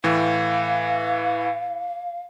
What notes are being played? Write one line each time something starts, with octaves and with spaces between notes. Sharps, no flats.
A2 E3 F5